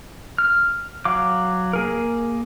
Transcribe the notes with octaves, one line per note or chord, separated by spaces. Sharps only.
F6
F#3 F5 D6
A#3 G#4 A#4